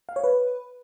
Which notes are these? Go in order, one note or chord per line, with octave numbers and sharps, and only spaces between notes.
F5
C#5
B4